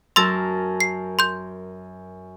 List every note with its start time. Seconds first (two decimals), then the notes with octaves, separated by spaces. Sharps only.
0.16 F#2 A#4 A5 C6 E6 A6
0.81 C7
1.19 C6 G6